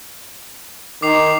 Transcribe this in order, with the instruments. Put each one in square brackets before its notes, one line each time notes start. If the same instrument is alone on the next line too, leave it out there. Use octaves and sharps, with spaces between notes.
[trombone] D#3 [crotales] D6 C7 F7